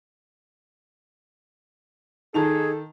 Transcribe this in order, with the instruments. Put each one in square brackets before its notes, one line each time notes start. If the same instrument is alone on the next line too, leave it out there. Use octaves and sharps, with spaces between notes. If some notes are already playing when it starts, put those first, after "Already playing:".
[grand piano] D#3 A5 F7 [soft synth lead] D#4 [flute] G#4 [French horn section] A4